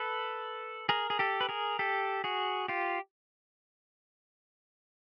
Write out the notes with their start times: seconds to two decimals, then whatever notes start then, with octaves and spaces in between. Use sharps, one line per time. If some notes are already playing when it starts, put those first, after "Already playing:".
Already playing: A4 B4
0.89 G#4 A#4
1.10 G#4
1.19 G4 A4
1.41 B4
1.49 G#4 A#4
1.79 G4 A4
2.24 F#4 G#4
2.68 F4 G4